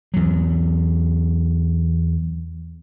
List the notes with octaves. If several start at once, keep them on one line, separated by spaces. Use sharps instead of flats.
E2 F#3